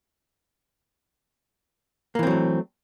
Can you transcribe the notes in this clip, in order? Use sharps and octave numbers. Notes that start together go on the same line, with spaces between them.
E3 F#3 A3 A#3 C4